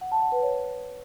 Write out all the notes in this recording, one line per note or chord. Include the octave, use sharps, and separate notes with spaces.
F#5
A5
F#5
B4
C#5